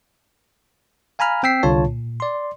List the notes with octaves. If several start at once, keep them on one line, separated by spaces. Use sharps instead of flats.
F5 G#5 A#5 B5 F6
C4 G5 E6 B6 C7
C2 D3 F4 C#5 A5
A#2
D5 C6